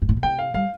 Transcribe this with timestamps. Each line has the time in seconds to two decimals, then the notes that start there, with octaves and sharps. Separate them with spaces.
0.02 G2
0.09 A2
0.17 B2
0.23 C3 G5
0.39 F5
0.54 G3 F5